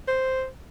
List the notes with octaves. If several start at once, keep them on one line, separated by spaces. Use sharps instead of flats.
C5